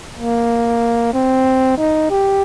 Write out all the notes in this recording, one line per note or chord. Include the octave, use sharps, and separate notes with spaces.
A#3
C4
D#4
G4